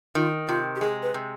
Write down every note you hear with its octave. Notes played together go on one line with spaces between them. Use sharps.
D#3 F4
C3 F4
G4
G#3 G#4
B4
C3